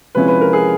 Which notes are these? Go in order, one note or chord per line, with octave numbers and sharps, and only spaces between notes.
C3 F3 G#3 C#4 E4 B4
B4
A#4
G#4